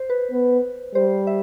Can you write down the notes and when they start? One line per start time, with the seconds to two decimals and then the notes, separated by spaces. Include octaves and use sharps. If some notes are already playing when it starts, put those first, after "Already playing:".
Already playing: C5
0.10 B4
0.31 B3
0.95 G3 C5
1.27 E5